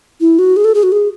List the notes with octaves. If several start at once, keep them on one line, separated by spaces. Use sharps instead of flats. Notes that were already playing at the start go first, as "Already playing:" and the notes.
E4
F#4
G#4
A4
G#4
F#4
G#4